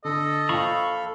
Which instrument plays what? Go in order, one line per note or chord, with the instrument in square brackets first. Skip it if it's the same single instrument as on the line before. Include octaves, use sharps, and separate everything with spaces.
[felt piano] D3 [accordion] A4 [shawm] D#5
[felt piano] A#1 G5 [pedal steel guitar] F5 B5 C#6